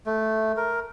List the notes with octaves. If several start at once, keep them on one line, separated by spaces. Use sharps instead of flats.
A3
A#4